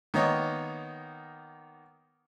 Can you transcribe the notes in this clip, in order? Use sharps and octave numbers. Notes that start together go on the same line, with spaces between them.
D#3 A#3 B3 C#5 D#5